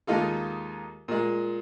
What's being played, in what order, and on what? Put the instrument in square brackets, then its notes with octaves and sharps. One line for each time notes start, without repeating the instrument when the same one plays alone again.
[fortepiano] D#2 G#3 D#4 F4 A4
A#2 G#3